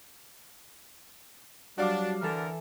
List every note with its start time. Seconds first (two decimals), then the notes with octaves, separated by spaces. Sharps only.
1.78 F#3 G3 D4 F#4 F5 D6
2.22 D3 E3 A4 A#4